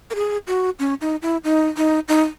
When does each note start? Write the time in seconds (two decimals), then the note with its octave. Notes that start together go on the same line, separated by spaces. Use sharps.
0.10 A#4
0.15 G#4
0.47 F#4
0.79 C#4
1.01 D#4
1.22 E4
1.44 D#4
1.77 D#4
2.08 D#4